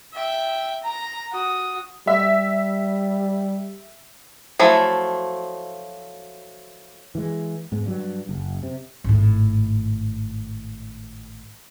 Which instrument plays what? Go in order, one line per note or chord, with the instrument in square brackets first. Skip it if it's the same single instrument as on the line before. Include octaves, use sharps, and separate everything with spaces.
[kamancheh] E5 G5
A#5
F#4 D#6
[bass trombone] G3 [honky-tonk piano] E5
[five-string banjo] F3 F#3 A3 E4 F4
[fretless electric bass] E3 G#3
G#2 G#3 B3
G2 F#3
F#1
C3
[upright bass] G#1 A2